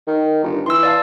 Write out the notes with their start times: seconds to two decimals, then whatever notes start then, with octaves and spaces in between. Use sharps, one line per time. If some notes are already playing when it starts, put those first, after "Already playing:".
0.07 D#3
0.44 G1
0.66 E3 C6 E6
0.83 D5 F5 A5